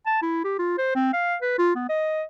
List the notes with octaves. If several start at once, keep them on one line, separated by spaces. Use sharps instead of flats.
A5
E4
G4
F4
C5
C4
F5
B4
F4
B3
D#5